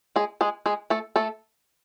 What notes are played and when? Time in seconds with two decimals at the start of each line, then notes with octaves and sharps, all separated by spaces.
0.16 G#3 G#4
0.41 G#3 G#4
0.66 G#3 G#4
0.90 A3 A4
1.16 A3 A4